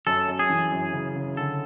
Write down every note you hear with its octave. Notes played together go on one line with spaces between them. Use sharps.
F#2 A4
F#2
G#4
E3
F#2
C#3
C#3
D3 A4